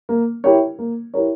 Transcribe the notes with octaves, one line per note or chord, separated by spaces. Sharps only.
A#3
E4 G4 A#4 C#5
A#3
E4 G4 A#4 C#5